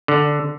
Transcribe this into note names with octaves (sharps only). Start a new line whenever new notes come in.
D3